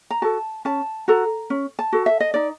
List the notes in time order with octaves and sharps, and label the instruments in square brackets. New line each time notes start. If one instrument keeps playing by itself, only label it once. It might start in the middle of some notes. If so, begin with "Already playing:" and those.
[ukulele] A#5
F#4 A4 A5
C#4 A5
F#4 A4 A#5
C#4
A5
F#4 A4
E5
D#5
D#4 D5